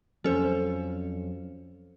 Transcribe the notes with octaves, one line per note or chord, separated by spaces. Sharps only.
F2 F#3 C#4 A4 C5